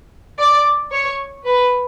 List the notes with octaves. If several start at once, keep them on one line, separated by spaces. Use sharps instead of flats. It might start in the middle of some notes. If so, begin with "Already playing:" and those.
D5
C#5
B4